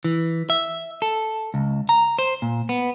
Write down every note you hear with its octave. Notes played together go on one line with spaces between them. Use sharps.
E3
E5
A4
C#2
A#5
C5
A#2
B3